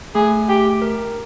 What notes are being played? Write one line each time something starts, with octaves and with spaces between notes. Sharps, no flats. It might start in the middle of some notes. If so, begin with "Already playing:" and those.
A3 G#4
A3 G4
A#4